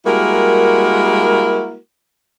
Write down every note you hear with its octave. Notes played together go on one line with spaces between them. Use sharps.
G3 G#3 A#3 E4 F#4 A#4